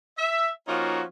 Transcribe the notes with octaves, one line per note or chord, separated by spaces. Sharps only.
E5
F3 A#3 C#4 D#4 F4 F#4